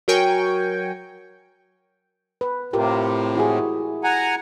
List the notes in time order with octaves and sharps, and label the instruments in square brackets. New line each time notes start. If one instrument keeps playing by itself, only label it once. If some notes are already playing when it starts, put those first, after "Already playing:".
[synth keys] F#3 A#4 G5 G#5 C#6
[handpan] B4
[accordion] A2 C3 [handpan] F4 G4 A#4
[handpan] E4 F#4 G#4
[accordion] F#5 G#5 A#5